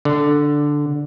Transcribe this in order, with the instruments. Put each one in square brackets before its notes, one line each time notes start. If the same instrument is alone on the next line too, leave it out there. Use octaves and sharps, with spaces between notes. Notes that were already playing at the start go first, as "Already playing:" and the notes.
[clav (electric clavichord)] D3